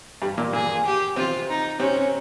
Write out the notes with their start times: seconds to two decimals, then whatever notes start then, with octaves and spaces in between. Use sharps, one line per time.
0.22 G2 G3
0.38 A#2 A#3
0.53 A#2 A#3 G#4
0.86 G4
1.16 C3 C4 F4
1.49 D#4
1.79 C3 C4 C#4